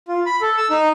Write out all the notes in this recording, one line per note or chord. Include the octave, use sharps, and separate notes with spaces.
F4
B5
A4
E6
D#4